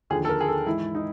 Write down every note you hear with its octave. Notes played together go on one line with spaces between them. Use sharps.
D#2 D3 F3 G#4
A4
A#4
G#4
A4
G#2 E3 E4
D#4